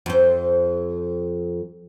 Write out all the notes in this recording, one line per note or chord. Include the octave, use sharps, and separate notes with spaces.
F2 C5